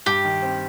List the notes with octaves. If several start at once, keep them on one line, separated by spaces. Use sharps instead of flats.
G2 G4
D#3
C4